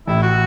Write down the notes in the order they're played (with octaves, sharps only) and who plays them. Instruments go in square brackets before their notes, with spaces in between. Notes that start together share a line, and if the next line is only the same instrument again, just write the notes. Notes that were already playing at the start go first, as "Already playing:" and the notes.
[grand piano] A1 A2 [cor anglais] E4
[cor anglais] F#4